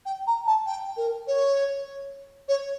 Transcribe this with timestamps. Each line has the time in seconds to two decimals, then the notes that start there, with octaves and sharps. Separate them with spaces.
0.06 G5
0.27 A#5
0.46 A5
0.66 G5
0.97 A#4
1.28 C#5
2.49 C#5